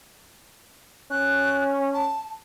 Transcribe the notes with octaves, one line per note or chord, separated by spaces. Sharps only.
C#4 F#6
A5